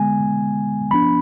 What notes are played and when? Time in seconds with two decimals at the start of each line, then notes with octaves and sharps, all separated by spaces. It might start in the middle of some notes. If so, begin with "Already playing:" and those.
Already playing: D3 G#3 B3 G#5
0.91 F3 B3 D4 B5